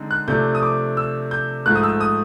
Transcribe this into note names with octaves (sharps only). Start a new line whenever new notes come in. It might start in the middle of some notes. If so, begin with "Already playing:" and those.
Already playing: D3 G#3 C4 D#4
F#6
C3 F3 A3 D4 G6
D#6
D6
E6
G6
G#2 F3 A3 F#6
D#6
E6
D#6